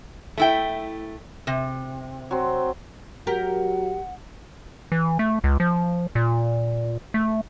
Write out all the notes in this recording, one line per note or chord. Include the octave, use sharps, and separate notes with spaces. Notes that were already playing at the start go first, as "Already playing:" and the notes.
A3 E4 G5
C3
F#3 C4
F#3 G4 A#4 F#5
E3
A3
C#2
F3
A#2
A3